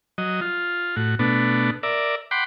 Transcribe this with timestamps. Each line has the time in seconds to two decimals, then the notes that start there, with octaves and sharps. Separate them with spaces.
0.18 F#3 D#5
0.41 F4
0.96 A2 F#4
1.19 B2 A3 B3 D4
1.83 A#4 D5 E5
2.31 F#5 G5 B5 C6 D6